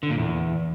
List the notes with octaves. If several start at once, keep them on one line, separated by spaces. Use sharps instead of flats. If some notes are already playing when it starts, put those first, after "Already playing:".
D3
A#2
E2